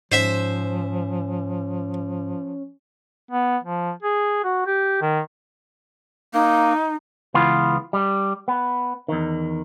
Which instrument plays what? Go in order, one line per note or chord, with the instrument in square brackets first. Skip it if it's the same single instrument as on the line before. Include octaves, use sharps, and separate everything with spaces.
[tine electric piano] G#2 [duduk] F3 [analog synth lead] C#4 [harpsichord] C5 E5
[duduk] B3
F3
G#4
F#4
G4
D#3
[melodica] A#3 [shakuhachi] D#4
[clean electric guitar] C#2 E3 B3 F4
G3
B3
E2 D#3